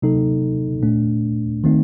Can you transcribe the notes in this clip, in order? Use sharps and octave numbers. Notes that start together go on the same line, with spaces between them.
C3 F#3 A#3 D#4 A4
A#2 A3 D4
D#3 A3 C4 D#4